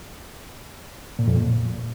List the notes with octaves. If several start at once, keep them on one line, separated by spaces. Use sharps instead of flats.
A#2
F2
A#2